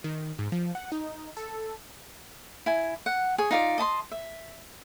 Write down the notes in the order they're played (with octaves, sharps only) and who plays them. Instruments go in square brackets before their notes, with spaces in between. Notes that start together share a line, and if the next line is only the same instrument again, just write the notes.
[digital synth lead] D#3
G#2
F3
F#5
D#4
A4
[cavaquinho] E4 G#5
F#5
G#4 C#5
D#4 F4 D5
D#5 A5 B5 C6
E5